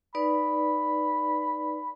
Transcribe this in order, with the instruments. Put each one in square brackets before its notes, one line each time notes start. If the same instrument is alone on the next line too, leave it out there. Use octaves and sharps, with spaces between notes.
[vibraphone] D#4 B4 D5 [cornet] B5